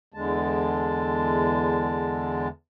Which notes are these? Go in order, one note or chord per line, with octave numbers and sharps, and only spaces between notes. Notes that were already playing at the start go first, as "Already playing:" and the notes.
E2 D3 G#3 A5